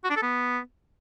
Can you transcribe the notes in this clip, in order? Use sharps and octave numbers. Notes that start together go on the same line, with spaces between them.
F#4
D4
A4
B3